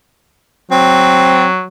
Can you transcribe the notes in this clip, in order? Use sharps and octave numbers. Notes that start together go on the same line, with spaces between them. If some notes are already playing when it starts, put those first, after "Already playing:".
F#3 C4